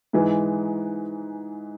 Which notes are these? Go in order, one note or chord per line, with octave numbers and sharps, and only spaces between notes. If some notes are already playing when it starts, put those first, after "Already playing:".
G#2 E3 G#3